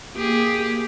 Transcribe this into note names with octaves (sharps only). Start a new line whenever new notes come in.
A#3 G4 G#4